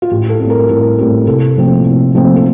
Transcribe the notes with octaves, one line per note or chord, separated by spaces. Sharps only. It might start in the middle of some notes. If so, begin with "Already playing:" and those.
F4
A1 G4
A4
A2 G3 C4
A#4
A1 A4
A2 G3 C4
C2 A4
A#2 F3 A3 C4
C2
A#2 F3 A3 C4
A4